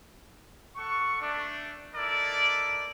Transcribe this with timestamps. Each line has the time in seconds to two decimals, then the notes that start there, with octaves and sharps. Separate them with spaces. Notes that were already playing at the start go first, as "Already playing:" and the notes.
0.76 A4 F#5 C#6
1.21 A3 D4
1.94 D#4 E4 A4 A#4 D5